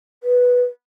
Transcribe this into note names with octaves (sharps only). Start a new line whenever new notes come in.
B4